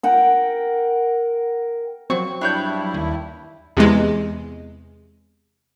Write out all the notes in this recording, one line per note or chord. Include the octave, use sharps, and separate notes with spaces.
A#4 F#5 G5
F#3 C4 C#6
G2 G3 D4 E4 C#5 G6
D#2
E2 C3 E3 G#3